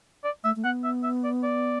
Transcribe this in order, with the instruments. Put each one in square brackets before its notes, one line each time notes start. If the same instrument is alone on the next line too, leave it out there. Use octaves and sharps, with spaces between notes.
[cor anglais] D5
[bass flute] A3 [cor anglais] E5
[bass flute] A3
[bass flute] B3 [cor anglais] F#5
[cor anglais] E5
E5
D5
D5